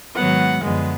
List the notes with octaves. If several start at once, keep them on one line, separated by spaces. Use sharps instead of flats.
G#2 D#3 F#3 B3 F#5
F#2 D3 F3 G#3 B3